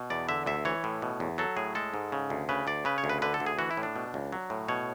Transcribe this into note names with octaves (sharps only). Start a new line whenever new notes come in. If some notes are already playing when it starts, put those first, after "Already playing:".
Already playing: B2
E2 D5
D3 E5
D2 E5
E3 C#5
A2
B2
E2
F#3 A4
A2 G#4
G#3 A4
G#2
C#3
D2
C#3 B4
D2 D5
C#3 B4
C#5
D2
B4
D3 B4
A4
D2
G#4
E3 F#4
E4
A2
D4
B2
C#2
F#3
A2
B2 C#5